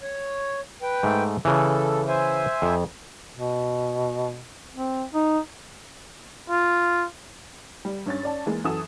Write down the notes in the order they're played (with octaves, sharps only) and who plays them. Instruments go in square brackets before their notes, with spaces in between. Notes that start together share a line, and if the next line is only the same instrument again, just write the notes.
[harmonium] C#5
B4 G5
[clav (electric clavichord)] G#2 A3
[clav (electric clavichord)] C#3 E3 [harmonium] A4
[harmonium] C5 E5 G#5
[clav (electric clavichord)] F2
[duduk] B2
C4
D#4
[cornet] F4
[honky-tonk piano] G3
G2 C#4 A6
C#4 D5 A5
E3 G#3 A#3
F#2 E3 F#4 A4 D#6 E7